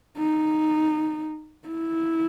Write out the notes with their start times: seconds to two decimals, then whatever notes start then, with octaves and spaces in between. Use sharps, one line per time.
0.18 D#4
1.68 E4